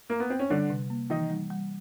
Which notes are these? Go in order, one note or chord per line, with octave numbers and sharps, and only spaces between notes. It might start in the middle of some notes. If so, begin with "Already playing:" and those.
A#3
B3
C4
C#4
D3 G3 D4
C3
A#3
D#3 E3 D#4
G3
G3